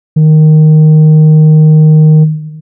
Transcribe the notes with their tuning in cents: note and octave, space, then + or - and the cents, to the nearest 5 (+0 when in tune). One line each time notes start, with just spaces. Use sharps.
D#3 -5